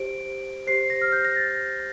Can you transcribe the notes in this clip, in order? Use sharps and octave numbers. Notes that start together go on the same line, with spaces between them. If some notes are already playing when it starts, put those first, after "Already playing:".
Already playing: G4 C5 D7
G4 C5 C7
A#6
F6
G6
A#6
A6